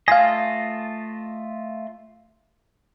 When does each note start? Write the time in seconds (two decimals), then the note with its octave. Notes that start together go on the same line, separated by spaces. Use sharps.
0.08 A3 F4 D#5 F5 G#5